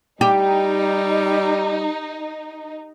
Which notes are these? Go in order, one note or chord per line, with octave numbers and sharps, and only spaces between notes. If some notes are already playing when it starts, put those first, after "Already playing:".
G3 D#4 G4